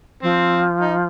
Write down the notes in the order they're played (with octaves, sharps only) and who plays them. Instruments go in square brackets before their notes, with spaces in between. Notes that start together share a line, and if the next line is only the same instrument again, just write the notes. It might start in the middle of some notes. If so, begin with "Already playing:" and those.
[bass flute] F3 [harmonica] C4
[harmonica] D#4